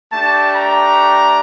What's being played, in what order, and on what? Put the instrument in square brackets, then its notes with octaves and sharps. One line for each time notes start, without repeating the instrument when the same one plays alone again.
[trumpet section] A3 D4 G4 A5
A#5